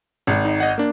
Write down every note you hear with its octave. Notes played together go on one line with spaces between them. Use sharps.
G#1
D#4
D#5 F#5
A#3 D4